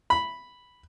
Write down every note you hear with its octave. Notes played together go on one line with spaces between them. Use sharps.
B5